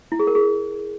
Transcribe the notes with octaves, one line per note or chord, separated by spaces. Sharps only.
E4
G#4
A#4
G#4